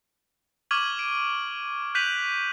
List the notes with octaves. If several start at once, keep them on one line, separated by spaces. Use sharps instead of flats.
C#6 D6 F6 G#6 D#7 F#7
D7
F#6 G6 B6 D#7 F7 F#7